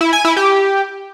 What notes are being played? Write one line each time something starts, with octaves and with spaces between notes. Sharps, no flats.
E4
G#5
E4
G4